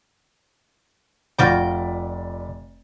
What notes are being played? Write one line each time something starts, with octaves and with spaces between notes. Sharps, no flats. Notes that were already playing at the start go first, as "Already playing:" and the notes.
F1 F4 F#4 D5 G5 B5